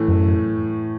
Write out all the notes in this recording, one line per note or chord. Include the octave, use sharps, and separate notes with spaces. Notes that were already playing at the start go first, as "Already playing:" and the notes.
Already playing: A2 E3 A3
F#2